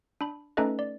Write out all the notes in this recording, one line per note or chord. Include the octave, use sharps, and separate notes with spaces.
D4 B5
A3 C#4 D#4 A4 B4 D#5
D5